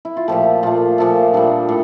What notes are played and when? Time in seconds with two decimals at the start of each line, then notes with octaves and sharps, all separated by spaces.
0.05 E4
0.17 F4
0.28 A#2 F3 A3 G4
0.63 A#2 A3 F4
0.98 A#2 F3 A3
1.33 A#2 G3 D4
1.69 A2